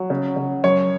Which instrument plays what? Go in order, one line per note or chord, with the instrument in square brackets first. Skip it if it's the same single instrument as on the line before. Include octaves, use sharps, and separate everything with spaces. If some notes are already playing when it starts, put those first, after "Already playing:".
Already playing: [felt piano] F#3
C#3
C#3
[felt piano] F#2 [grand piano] C#5